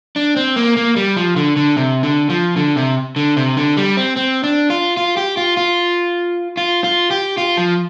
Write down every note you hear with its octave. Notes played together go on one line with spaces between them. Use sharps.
D4
C4
A#3
A#3
G3
F3
D3
D3
C3
D3
F3
D3
C3
D3
C3
D3
G3
C4
C4
D4
F4
F4
G4
F4
F4
F4
F4
G4
F4
F3